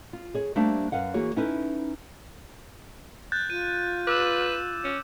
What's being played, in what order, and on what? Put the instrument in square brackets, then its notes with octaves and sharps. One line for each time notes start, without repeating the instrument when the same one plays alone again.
[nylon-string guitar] F4
G#4 C#5
G3 A3 A#3 D4 C5
F#2 B4 F5 F#5
E3 A#3 F#4 G#4 C#5
C#4 D#4 E4 A4 B4
[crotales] F#6 G6 A6
[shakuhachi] F4 [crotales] D#7
[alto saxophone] B4 [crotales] D6 E6 E7
[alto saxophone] C#4